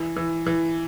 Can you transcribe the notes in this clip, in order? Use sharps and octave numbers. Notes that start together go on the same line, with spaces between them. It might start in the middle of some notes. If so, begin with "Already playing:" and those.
Already playing: E3
E3
E3